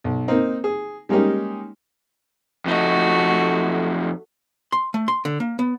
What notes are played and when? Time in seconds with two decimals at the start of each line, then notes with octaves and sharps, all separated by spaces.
0.04 B1
0.28 A#3 C4 D#4
0.64 G#4
1.09 G3 G#3 A#3 C#4 D#4 G4
2.65 F2 A3 D#4 F#4
4.72 C6
4.94 A3
5.08 C6
5.25 D3
5.40 A#3
5.59 B3